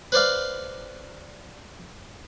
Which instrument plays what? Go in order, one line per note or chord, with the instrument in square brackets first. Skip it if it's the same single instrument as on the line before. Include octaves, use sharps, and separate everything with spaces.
[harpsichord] B4 C5 D5 F5